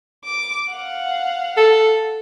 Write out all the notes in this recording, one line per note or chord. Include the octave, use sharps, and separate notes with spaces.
D6
F5 F#5
A4